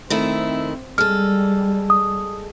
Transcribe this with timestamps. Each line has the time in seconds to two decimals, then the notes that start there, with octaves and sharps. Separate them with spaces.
0.10 D#3 A3 C4 E4
0.98 G3 G#3 A4 F6
1.90 D#6